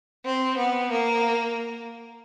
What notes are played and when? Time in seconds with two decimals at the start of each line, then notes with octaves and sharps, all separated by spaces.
0.24 C4
0.57 B3
0.91 A#3